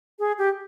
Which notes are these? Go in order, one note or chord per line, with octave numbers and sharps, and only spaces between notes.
G#4
G4